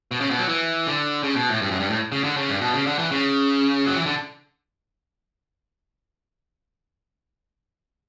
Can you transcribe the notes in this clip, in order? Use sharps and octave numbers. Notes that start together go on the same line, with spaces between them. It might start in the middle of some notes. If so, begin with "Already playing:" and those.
B2
C#3
B2
F#3
E3
D3
C#3
B2
A2
G2
F#2
G2
A2
C#3
D3
C#3
G2
B2
C#3
D3
E3
C#3
F#3
E3
D3